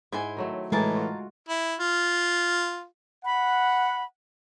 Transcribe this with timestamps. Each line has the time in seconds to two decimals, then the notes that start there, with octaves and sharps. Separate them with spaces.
0.12 G#2 E4 C5 G#5
0.37 D#3 F#3 A3
0.72 A2 E3 G#3 G#4 A#4 A5
0.95 F4 F#4
1.48 E4
1.80 F4
3.25 F#5 B5